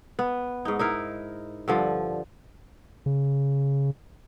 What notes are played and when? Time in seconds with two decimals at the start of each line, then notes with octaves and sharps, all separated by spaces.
0.19 B3
0.65 G#2 D#4
0.79 D#4 E4 A#4
1.68 G2 D3 F3
3.06 C#3